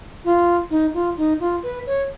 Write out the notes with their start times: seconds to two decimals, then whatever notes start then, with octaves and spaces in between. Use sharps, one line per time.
0.25 F4
0.70 D#4
0.94 F4
1.17 D#4
1.40 F4
1.63 B4
1.86 C#5